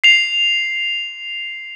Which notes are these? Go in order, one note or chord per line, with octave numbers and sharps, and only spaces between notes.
C7 F7